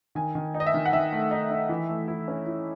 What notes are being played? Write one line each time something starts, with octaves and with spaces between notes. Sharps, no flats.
D#3 G#5
D#3
D#4
D#5
E5
D#3
F#5
D#3 E5
A3
D#4
D#4
E3
A3
E4
C#4
E4